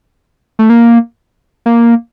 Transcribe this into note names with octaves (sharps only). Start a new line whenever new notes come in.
A3
A#3
A#3